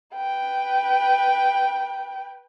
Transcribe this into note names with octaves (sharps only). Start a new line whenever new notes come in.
B4 G5